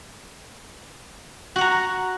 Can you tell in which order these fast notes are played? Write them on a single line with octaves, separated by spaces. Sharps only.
F#4 F#5 A#5